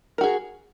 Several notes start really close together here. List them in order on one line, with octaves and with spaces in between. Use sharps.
A#4 F#4 G#4